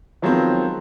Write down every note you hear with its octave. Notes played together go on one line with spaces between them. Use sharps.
D#3 F3 F#3 G#3 B3 C4